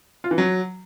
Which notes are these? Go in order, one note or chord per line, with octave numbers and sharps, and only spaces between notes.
F4
E3
F#3